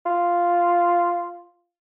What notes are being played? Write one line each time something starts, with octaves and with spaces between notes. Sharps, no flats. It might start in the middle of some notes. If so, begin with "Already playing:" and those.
F4